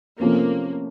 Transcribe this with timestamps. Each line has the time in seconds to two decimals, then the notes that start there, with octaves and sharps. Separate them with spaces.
0.20 C3 F3 A3 A#3 C#4